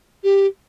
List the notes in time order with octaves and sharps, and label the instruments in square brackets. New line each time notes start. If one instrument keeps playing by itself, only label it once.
[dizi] G4